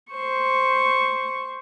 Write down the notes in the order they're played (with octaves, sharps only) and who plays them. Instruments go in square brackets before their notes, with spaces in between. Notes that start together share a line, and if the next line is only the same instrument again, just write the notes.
[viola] C5 C#6